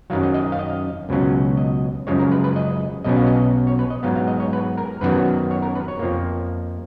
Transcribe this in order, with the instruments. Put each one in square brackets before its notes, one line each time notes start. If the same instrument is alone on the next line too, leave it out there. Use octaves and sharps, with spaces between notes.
[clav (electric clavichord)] F#2 D#3 F#3 F5
D#5
D#5
F5
D#5
C#2 B2 F#3 C#4
D#5
F#2 C#3 F3 G#3 C#5
A#4
B4
B4
D#5
B1 B2 F#3 C#4 D#5
F5
D#5
C#5
B4
D#5
G#2 F#3 B3 F5
F5
D#5
C#5
B4
A#4
F#2 D#3 F#3 B3 B4
C#5
A#4
B4
C#5
F2 F3 A#3